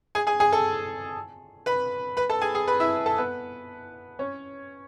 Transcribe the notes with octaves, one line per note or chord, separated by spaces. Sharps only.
G#4 G#5
G#4 G#5
G#4 G#5
A4 A5
B4 B5
B4 B5
A4 A5
G#4 G#5
G#4 G#5
B4 B5
E4 E5
A4 A5
B3 B4
C#4 C#5